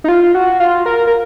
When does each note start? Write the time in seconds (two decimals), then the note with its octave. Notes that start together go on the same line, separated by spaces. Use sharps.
0.04 D#4
0.08 F4
0.34 F#4
0.60 F4
0.86 A#4
1.07 A#4